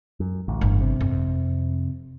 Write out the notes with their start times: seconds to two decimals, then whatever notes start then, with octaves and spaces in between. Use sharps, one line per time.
0.20 F#2
0.48 A1 D2
0.61 G1
0.81 C3
1.01 F2